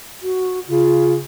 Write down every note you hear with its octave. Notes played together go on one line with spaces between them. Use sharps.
F#4
C#3 F4